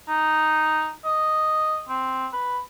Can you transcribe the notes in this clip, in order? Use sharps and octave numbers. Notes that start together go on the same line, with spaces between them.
D#4
D#5
C4
B4